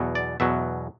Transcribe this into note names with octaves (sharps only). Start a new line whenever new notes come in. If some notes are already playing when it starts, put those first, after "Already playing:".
Already playing: E2 B2 F#3
D5
E2 B2 F#3 E5